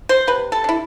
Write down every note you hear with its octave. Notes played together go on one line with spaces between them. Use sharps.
C5
C3 B4
A4
D4 E4